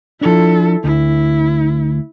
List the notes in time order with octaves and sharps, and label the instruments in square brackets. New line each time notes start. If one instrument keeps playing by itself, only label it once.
[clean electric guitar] F3 D4 [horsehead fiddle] E4 A4
[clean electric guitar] D2 [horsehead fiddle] E4